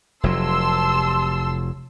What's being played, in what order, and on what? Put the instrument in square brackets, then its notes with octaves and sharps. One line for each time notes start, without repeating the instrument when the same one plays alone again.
[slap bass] F1 F#3 [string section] A5 C6 E6